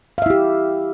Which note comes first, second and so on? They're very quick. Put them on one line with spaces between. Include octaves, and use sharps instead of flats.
F5 E5 E4 G4